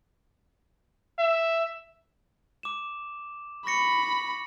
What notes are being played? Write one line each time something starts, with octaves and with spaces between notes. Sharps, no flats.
E5
D6 E7
B5 C#6 A#6 C#7